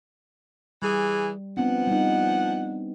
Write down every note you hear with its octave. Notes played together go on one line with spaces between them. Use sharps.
E3 G3 G#4
F3 B3 C4 D4 F#5
G3 D#4